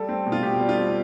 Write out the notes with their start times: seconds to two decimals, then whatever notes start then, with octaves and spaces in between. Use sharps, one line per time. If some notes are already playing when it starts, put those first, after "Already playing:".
Already playing: G3 A4
0.09 C4
0.26 B2
0.32 F4
0.43 B2 G4
0.60 G3
0.69 F4
0.77 C4